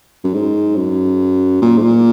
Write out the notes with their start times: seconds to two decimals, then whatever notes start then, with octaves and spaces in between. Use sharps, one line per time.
0.24 F#2
0.34 G#2
0.76 F#2
1.62 A#2
1.78 G#2
1.83 A#2